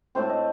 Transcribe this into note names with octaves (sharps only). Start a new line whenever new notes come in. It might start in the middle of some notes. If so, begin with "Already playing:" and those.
A2 A3 C4 C5
D#5